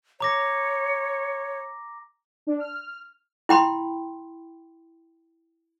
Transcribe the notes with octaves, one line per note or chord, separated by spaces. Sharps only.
C#5 A#5 D6 A#6
D4
F6
E4 G5 B5 C6